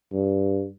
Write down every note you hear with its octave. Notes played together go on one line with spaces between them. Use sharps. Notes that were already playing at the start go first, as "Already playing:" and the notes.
G2